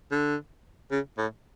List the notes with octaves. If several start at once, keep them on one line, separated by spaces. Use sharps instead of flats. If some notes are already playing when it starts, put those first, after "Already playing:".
D3
C#3
A2